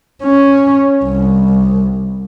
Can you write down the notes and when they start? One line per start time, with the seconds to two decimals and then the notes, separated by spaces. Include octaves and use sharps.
0.23 C#4
1.03 C2